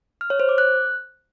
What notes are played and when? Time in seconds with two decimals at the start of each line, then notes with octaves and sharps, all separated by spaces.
0.21 F6
0.30 C#5
0.40 C5
0.49 D6
0.58 F#6